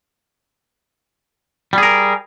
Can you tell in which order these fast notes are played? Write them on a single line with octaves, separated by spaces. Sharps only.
G3 G#4 A#4